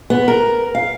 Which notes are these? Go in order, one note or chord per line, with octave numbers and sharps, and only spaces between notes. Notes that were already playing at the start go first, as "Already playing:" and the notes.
B3
A#4
F5